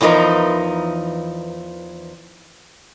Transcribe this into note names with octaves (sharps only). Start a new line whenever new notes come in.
E2 E3 F3 D#4 A#4